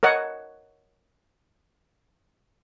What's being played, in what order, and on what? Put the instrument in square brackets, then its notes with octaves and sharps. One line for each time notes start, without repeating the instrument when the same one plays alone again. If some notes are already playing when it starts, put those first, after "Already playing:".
[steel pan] A#4 C#5 D#5 F#5